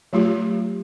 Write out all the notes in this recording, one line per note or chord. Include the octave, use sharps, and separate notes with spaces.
F#3 A3 F4 G4